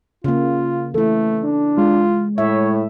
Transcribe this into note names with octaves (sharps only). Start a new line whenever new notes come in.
C#3 A#3 F4
E3 A3 E4 A4
D4
G#3 F4
A2 C#5 E5